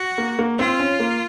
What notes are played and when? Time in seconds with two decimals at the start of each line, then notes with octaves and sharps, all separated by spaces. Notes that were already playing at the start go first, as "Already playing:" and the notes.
Already playing: F#4
0.18 A#3
0.39 A#3
0.58 C4 F4
0.80 C#4
1.00 A#3